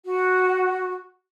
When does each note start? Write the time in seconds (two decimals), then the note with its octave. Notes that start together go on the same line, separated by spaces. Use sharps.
0.05 F#4